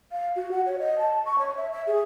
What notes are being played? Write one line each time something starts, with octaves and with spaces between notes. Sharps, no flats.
F5
F#4
F#5
C#5
D#5
A5
C#6
C#5
E5
E5
G#4